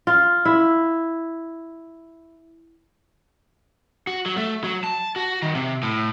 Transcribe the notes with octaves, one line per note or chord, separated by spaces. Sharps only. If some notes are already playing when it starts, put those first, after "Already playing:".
F4
E4
F#4
F#3
A3
F#3
A5
F#4
D#3
C3
A2